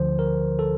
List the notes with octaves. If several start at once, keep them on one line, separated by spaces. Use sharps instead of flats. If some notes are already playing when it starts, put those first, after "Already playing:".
Already playing: D2 D3 F3 C5
A#4
A4